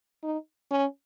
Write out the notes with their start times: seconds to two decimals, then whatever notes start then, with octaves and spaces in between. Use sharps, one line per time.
0.23 D#4
0.71 C#4